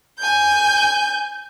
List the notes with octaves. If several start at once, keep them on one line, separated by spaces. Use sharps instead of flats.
G#5 G6